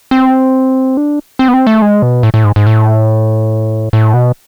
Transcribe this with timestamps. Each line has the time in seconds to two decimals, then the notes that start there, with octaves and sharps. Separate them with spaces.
0.11 C4
0.97 D4
1.39 C4
1.48 B3
1.54 C4
1.67 A3
1.82 G#3
2.02 B2
2.23 A2
2.34 A2
2.45 G#2
2.56 G#2
2.67 A2
3.93 A2
4.14 B2